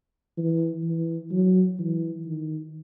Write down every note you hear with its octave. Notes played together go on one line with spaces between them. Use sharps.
E3
E3
F#3
E3
D#3